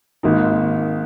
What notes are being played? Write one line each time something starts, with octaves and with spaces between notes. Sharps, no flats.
G#1 G#2 D#3 A#3 D#4